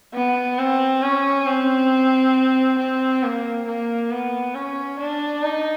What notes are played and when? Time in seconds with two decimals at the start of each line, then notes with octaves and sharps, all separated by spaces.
0.14 B3
0.59 C4
1.03 C#4
1.47 C4
2.79 C4
3.23 A#3
3.67 A#3
4.11 B3
4.55 C#4
5.00 D4
5.43 D#4